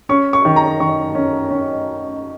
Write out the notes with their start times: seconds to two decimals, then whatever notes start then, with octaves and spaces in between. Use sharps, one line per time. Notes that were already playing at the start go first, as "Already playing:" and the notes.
0.09 C#4 C#6
0.33 C#6
0.45 D#3
0.56 A#5
0.80 D#3 C#6
1.15 C#4
1.50 C#4